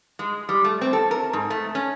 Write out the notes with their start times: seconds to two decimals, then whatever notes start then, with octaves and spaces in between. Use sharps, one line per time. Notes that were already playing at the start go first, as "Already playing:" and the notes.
0.19 G#3
0.49 G3
0.64 A3
0.81 C4
0.93 A4
1.11 A#4
1.33 G#2
1.50 A3
1.75 C#4